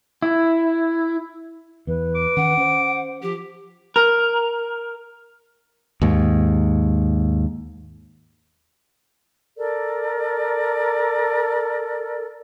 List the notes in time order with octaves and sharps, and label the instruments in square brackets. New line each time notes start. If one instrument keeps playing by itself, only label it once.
[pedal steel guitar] E4
[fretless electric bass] E2 [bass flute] B4
[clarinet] D6
[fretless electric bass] D#3 C#4 [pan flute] F#5
[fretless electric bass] C#4 [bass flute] C5
[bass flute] F3 [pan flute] G4
[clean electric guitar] A#4
[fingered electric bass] D#2 G#2
[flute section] A4 A#4 D5